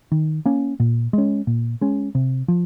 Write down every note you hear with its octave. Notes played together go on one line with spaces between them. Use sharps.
D#3
A#3 C#4
A#2
G#3 C#4
A#2
G#3 C#4
C3
F3